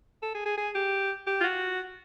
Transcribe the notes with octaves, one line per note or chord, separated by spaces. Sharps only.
A4
G#4
G#4
G#4
G4
G4
F4
F#4